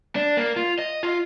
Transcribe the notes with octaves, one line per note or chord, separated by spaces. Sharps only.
D4
A#3
F4
D#5
F4